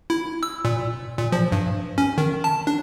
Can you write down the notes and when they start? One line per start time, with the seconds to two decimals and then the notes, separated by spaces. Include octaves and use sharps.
0.10 E4
0.43 E6
0.65 A#2
1.18 A#2
1.32 F3
1.52 G2
1.98 C#4
2.18 D#3
2.44 A5
2.67 D4